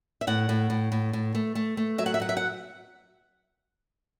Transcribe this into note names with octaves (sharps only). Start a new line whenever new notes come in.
E5
A2 F#5
A2
A2
A2
A2
A3
A3
A3
F#3 E5
F#5
E5
F#3 F#5
E5
F#5